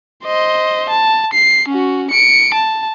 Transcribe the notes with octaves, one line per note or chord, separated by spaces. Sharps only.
C5 D#5
A5
C7
C#4 F#4
C#7 D7
A5